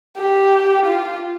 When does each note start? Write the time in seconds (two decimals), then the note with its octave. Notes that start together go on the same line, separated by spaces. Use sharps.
0.18 G4
0.86 F4